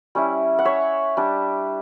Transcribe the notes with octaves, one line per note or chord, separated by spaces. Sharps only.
G3 C#4 E4
F#5
C#5 E5
G3 D4